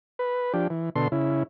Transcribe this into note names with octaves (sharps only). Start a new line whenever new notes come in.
B4
F3 D4 G4
E3
B2 D3 A4 C6
C#3 E4